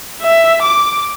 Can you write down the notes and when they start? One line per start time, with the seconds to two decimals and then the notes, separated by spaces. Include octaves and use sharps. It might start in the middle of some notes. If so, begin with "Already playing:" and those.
0.22 E5
0.63 D6